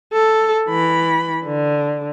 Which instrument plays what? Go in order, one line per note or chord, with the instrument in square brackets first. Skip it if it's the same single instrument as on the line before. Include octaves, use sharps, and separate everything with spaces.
[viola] A4
E3 B5
D3